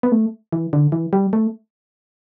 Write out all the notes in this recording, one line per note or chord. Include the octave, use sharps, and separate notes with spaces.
B3
A3
E3
D3
E3
G3
A3